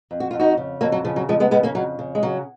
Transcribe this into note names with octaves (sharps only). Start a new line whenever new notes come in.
F2
F#4
F2 F4
D#4 F#4
C#3
F2 F#3 A#3
F#3
C#3 F3
F#3
F2 F3 G#3
G#3 B3
C#3 G#3 B3
A#3 C#4
F2 F#3
C#3
G#3
C#3 F#3